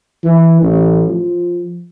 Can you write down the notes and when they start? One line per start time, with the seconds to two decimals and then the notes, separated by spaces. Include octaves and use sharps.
0.24 E3
0.62 A1
1.08 F3